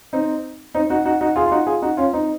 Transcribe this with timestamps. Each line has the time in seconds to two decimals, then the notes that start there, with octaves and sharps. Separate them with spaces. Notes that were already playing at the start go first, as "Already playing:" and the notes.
0.13 C4 D#4
0.75 C4 D#4
0.90 D#4 F#4
1.05 D#4 F#4
1.21 D#4 F#4
1.36 F4 G#4
1.46 F4
1.51 D#4 F#4
1.67 F4 G#4
1.82 D#4 F#4
1.97 C#4 F4
2.13 C4 D#4